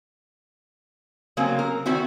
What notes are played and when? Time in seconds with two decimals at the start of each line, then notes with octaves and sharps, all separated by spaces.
1.37 C#3 F#3 A#3 C4
1.59 A#4
1.86 D#3 C4 E4 F#4